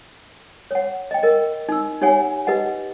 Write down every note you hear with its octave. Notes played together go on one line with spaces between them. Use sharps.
C#5 F#5
D#5 G5
A#4 D#5
D#4 E6
D#4 G4 C#5 F#5 G#5
G4 B4 D#5 F#5